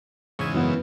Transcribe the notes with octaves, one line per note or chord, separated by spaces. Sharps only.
E2 G#2 C#3 C#5 E5 G#5
F#2 E3 B3